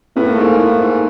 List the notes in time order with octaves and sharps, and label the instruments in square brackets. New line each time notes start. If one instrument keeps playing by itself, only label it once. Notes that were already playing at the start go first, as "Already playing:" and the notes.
[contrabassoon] A2 [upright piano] B3
[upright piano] A#3
A3
[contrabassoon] G#2 [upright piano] A#3
[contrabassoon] A2
G#2